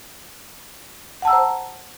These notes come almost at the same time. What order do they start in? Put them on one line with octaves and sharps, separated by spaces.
F#5 A5 E6 A#5 C5